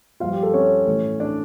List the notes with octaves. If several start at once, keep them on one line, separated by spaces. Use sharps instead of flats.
G2 F3 A#3 F4 F5
G4
A4
C#4 C#5
A2 E3 A3
D4 D5